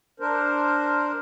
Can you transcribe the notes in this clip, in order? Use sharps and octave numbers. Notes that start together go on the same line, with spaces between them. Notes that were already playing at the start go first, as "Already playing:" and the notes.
D4 A#4 C5